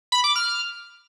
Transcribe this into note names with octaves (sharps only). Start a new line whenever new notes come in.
B5
D6
F6